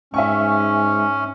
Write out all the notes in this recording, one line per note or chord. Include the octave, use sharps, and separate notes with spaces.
G#2 C#4 E5 G#5 C#6